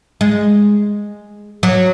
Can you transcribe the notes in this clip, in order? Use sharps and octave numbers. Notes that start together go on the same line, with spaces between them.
G#3
F#3